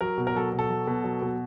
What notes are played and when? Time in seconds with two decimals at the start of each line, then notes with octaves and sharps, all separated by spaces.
0.01 F#3 A#4
0.18 B2
0.27 A#4
0.35 F#3 A4
0.53 B2
0.59 A4
0.69 F#3
0.87 B2
1.04 F#3
1.22 B2